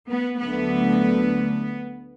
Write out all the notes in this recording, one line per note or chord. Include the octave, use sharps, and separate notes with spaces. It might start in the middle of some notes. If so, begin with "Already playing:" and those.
B3
D2 D3 F#3 A3 B3